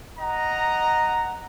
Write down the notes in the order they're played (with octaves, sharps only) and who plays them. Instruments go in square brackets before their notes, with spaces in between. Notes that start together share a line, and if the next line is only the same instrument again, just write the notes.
[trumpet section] D#5 F#5 A#5